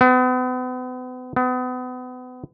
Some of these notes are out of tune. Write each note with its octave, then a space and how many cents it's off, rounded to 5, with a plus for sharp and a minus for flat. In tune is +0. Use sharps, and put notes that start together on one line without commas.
B3 +40
B3 +35